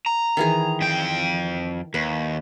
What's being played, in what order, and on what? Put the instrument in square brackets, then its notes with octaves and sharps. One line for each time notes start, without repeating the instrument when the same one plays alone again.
[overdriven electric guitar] A#5
[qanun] D#3 E3 G#4
[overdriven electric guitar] F2 G5
[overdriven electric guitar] D#2 [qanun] B4